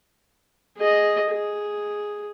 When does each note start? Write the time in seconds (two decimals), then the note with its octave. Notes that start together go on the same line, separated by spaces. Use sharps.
0.77 G#4 D#5
1.30 G#4